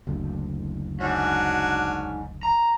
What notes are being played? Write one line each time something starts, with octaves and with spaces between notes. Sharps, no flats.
F#1 D2
G#2 C#4 D4 F#4
A#5